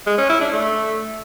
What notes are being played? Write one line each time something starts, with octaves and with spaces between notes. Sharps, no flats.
G#3
C#4
E4
D4
A3